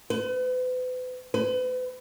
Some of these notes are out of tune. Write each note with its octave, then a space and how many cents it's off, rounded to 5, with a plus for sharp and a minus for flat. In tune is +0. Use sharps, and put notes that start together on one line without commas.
B4 +40
B4 +40